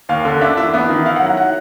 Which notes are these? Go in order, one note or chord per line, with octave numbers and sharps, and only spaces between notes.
D#2 F5
D3
D4 E5
E3 E5
B3 E5
D#3
E4 F5
F#5
F#3
F#5
F#5